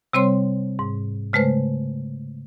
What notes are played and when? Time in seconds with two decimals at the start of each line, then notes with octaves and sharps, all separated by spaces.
0.13 C3 G3 C4 C5 C#5 C6
0.79 G#2
1.33 C#3 G#3 A3 B4 C5